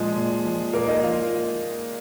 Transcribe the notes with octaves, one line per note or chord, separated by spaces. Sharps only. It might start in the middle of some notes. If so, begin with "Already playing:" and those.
Already playing: A#2 F3 G#3 G#4
A#2
F3
A#2 A#3 A#4
D#4 D#5
F3 F4 F5